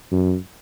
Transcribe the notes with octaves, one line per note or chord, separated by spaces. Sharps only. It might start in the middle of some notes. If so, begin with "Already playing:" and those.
F#2